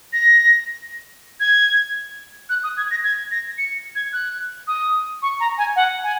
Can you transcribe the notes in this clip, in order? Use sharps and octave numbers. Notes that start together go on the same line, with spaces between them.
A#6
G#6
F#6
D#6
G#6
A#6
G#6
A#6
C#7
G#6
F#6
D#6
C#6
A#5
G#5
F#5
G#5